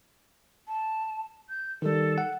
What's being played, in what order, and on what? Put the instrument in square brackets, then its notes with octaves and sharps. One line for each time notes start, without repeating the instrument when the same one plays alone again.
[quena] A5
G6
[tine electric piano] D#3 G3 [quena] A4
[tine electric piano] F#5